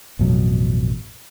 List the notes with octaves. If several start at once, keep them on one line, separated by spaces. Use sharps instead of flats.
A1 F2 B2 F#3